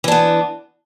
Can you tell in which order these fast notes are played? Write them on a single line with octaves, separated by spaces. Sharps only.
E3 D4 B3